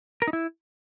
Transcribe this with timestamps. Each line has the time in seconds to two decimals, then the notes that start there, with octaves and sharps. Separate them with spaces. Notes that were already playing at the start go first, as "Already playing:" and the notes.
0.22 A#4
0.28 D#4
0.33 E4